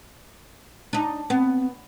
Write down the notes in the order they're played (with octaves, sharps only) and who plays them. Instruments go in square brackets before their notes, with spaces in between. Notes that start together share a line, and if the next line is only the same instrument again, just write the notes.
[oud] D4 D#4
[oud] B3 [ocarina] C4